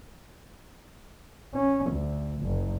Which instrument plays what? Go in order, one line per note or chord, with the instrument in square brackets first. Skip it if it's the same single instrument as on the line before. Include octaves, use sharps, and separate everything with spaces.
[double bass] C#4
D2
F#1